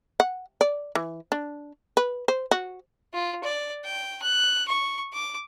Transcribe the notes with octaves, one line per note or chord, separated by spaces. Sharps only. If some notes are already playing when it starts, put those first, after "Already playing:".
F#5
D5
E3
D4
B4
C5
F#4
F4
D5
G5
F#6
C#6
D6